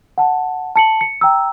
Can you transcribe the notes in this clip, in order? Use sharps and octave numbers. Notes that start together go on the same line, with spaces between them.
F#5 A5
A5 C#7 F#7
C#7
G5 A#5 E6